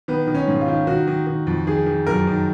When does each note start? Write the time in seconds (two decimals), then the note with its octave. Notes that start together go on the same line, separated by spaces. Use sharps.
0.08 D#3 B3
0.27 D#3
0.35 C#4
0.47 G#2
0.61 F4
0.68 D#3
0.87 D#3 F#4
1.07 D#3
1.27 D#3
1.47 F2
1.67 D#3 G#4
1.86 D#3
2.06 F#2 A#4
2.27 D#3